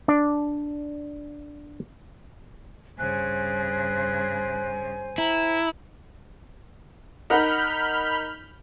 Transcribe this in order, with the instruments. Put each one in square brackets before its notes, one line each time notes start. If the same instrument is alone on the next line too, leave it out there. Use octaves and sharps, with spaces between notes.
[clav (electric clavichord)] D4 D5
[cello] G2 C#3 [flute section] C5 G#5 [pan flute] F#6
[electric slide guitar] E4 [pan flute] A#5
[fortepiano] D#4 A#4 F#5 [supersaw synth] B5 F6 G6